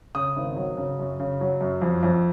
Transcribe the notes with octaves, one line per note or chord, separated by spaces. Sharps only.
C#3 D#6
G#1
F#3
C#3
F#2
C#3
F#3
F#2
F2
F2